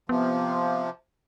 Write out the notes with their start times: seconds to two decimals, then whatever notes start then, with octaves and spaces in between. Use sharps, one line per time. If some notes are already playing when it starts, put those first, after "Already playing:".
0.09 C3 F3 B3